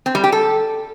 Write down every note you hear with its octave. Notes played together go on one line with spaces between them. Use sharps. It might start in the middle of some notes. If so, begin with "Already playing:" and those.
C4
G3
G4
A4